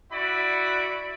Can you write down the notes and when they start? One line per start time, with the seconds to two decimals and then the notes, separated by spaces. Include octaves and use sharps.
0.11 E4 F#4 D5 B5